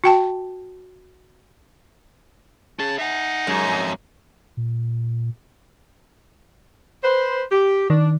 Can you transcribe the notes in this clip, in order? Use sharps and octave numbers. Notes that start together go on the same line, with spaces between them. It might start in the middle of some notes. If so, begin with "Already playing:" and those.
F#4 G5 A5
C#4 G#4 A5
D#4 E5 F#5
F#2 F#3 G#3
F2 G#2
A#2
B4 C5
G4
D#3 D4